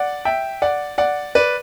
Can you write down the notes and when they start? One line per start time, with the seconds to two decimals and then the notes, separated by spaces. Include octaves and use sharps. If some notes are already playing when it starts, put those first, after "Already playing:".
Already playing: D5 F#5
0.25 E5 G5
0.62 D5 F#5
0.98 D5 F#5
1.35 B4 D5